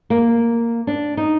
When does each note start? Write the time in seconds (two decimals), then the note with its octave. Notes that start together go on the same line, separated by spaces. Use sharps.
0.10 A#3
0.87 D4
1.17 D#4